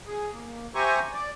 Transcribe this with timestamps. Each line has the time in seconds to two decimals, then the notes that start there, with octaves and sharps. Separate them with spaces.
0.07 G#4
0.33 A#3
0.75 G4 C5 E5 G#5 A#5 C#6
1.13 D5